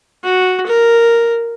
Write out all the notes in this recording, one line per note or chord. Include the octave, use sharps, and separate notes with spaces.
F#4
A#4